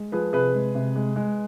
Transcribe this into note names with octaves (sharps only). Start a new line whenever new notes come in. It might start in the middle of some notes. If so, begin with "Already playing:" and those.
Already playing: G#3
F3 G#4 B4
C3 G#4 B4
G#3
C3
G#3
G#3